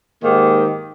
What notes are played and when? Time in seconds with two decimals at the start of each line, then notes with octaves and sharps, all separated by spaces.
0.23 G#2 D#3 A#3 G4